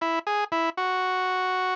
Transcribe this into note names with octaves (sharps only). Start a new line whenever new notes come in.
E4
G#4
E4
F#4